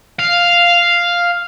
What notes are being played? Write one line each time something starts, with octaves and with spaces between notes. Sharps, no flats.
F5